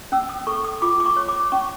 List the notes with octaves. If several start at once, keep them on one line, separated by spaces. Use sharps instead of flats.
C#4 E6
D#6
A4 C#6
D#6
F4 D6
D6
C#6
C#5
D6
C#4 C#6